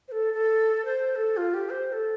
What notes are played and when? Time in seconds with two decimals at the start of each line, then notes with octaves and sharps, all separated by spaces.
0.08 C5
0.12 A4
0.34 A4
0.85 C5
1.11 C5
1.15 A4
1.37 F4
1.54 G4
1.70 C5
1.88 C5
1.92 A4